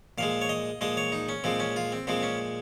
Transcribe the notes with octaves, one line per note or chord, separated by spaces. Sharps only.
A#2 F3 G#3 F5
C#5
D#5
A#2 F3 G#3 D#5
C#5
D#4
C#4
A#2 F3 G#3 C4
C#4
F4
C4
A#2 F3 G#3 C4
C#4